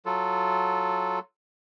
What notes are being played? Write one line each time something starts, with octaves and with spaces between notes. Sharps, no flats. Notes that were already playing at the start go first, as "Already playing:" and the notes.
F#3 F4 A4